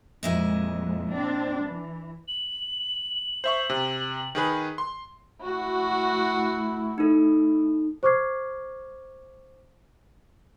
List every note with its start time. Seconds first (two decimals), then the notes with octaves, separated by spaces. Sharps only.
0.23 F2 A#2 G#3 E4 D#5
1.10 C4 D4
1.62 E3
2.28 F#7
3.44 C5 E5 C#6
3.70 C3
4.35 D#3 G#4 B4
4.78 C6
5.41 A3 E4 F#4
6.98 D#4 A4
8.03 C5 C#6 D6 F6 G#6 C7